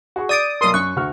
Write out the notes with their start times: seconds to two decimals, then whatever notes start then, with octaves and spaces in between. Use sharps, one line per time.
0.16 F#4 G#4 C#6
0.29 D5 D6 D#6 A6 D7
0.61 B1 A#4 C6 D#6
0.74 F#2 C#6 F#6
0.96 D2 F#4 F6